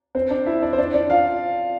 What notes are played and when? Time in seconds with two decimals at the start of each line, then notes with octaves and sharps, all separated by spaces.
0.15 C4 C5
0.31 D4 D5
0.46 E4 E5
0.62 D4 D5
0.73 C5
0.78 D4 D5
0.94 D4 D5
1.10 F4 F5